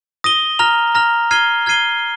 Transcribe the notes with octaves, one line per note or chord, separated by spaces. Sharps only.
D#6 A#6 D#7 G7
A#5 F6 A#6 F7
A#5 F6 A#6 F7
F6 G#6 C7 D#7 G7
F6 G#6 C7 D#7 G7